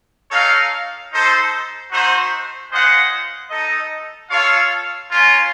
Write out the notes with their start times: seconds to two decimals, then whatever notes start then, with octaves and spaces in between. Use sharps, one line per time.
0.31 D#4 A4 C#5 F5
1.11 D#4 A4 C5
1.90 A3 D#4 F#4 C5
2.70 C#4 F4 C5 D#5 F#5
3.50 D#4 A4 D#5
4.30 F4 A4 C#5 F5
5.09 A#3 C#4 F4